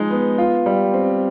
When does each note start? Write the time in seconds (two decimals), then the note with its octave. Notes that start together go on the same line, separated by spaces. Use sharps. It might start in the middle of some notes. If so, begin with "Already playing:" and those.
Already playing: F3 G#3 D#4
0.11 B3
0.38 F4
0.66 G3
0.94 C4